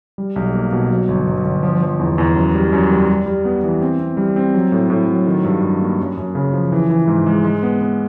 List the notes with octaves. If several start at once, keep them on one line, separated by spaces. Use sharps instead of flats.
G3
B1
A#3
B2
F#3
G1
G1
G1
F3
F3
E2
E2
F#2
G3
F#2
G3
G3
G3
B3
E3
C4
C4
G3
C4
F#3
A2
A2
F#3
D#3
G2
G2
A#3
F#2
F#2
C#3
F3
E3
E3
G#2
G#3
G#3
B3
B3